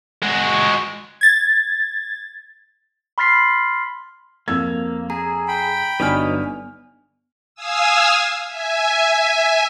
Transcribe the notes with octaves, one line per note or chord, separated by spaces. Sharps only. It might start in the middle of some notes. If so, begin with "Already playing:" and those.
G#3 F#4
G#6 A6
B5 C6 F6 A6 B6 C7
F2 A#3 E6 G#6
G#4 A#5
G5 B5
G1 F#3 B3 D#4 B4 D5 G#5 F6
F5 G#5 D#6 E6
E5 G#5